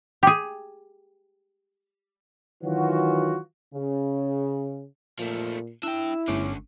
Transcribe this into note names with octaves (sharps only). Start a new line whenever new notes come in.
G4 G#4
D#3 E3 F#3 F4 F#4
C#3
A#2 F3 A3
D4 E4 G5 E6
G1 D3 A3 C#4 D6